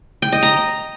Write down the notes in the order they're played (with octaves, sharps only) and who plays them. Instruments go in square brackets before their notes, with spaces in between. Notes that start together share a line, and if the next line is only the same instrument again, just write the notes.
[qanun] G5
D#5
A#5